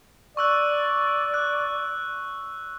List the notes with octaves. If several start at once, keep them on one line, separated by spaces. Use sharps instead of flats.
D5 C#6 E6 F#6
F#6